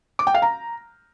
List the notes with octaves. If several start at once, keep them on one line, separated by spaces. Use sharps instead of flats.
D6
G5
F5
A#5